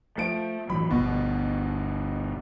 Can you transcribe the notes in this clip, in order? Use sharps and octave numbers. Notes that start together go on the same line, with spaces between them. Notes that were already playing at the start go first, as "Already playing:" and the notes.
F3 A3 D7
A2 E3 F#3 B5
G1 D2 B2